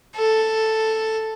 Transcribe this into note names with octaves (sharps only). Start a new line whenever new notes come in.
A4